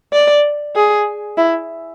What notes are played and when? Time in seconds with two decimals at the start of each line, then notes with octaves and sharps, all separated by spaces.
0.13 D5
0.75 G#4
1.37 E4